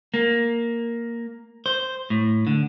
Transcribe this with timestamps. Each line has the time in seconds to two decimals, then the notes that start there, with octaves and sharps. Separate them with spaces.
0.14 A#3
1.66 C5
2.10 A2
2.47 D3